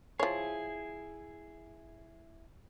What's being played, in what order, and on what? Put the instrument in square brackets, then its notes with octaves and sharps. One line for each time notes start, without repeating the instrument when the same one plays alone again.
[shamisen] F3 C#5 [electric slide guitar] E4 G#4